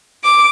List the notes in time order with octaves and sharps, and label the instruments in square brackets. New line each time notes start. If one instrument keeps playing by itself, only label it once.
[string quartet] D6